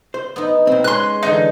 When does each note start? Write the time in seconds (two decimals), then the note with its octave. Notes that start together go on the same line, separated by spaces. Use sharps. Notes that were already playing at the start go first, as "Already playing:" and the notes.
0.14 C5
0.36 B3 D#4
0.67 A#2 C4
0.84 G#3 C#4 C6 F#6
1.23 D3 E3 D#4 G#4